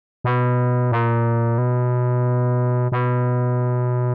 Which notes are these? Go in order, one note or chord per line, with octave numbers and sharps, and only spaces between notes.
B2
A#2
B2
B2